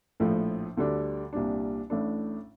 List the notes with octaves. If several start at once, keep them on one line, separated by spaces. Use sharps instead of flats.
A#1 A2 F3 A3
D2 D3 G3 D4
C2 A#2 G3 D4
A1 A2 A3 D4